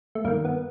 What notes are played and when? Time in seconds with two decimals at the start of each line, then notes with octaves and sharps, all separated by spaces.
0.15 A3
0.24 G2 D#3 A#3
0.45 B3